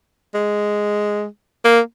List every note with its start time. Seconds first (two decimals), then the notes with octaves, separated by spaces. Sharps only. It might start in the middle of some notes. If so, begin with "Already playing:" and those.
0.34 G#3
1.64 A#3